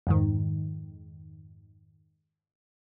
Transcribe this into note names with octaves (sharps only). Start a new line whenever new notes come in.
F2 G#2 D#3